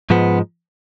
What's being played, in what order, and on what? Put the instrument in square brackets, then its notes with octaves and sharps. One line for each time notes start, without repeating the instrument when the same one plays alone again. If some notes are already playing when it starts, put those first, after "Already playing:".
[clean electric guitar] G#2 F3 G#3 B3